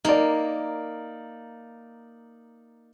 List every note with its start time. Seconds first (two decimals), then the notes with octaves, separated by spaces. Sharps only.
0.05 A#3 D#4 D5